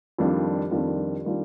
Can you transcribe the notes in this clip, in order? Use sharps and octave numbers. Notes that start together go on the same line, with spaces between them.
F2 D#3 G3 D4 F4
F2 D#3 G3 D4 F4
D#3 G3 D4 F4